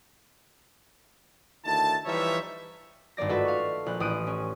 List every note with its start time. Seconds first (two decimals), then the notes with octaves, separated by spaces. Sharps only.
1.65 D2 D#3 E4 A5
2.06 E3 F3 G3 D#4 C#5 E5
3.17 G#1 G2 A#3 D5 A#6
3.29 A3 F4 F#4 A4 B4 E5
3.45 F5 C#6
3.86 A#1 F#6
4.00 A1 A2 D#6 F#6 D7 D#7
4.27 C#4